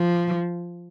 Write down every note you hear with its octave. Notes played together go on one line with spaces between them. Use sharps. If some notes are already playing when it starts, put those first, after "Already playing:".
Already playing: F3